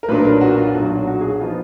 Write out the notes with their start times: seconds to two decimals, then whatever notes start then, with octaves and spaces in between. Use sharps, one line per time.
0.03 A#4
0.08 B1 A#2 F#3 D4 B4
0.25 A#4
0.41 F#4
0.58 F4
0.74 B1 A#2 F#3 D4 F#4
1.07 F#4
1.21 G#4
1.30 F#4
1.40 F3 B3 D#4 F4